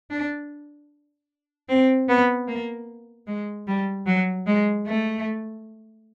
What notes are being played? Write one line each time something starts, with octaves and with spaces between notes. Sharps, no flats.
D4
C4
B3
A#3
G#3
G3
F#3
G#3
A3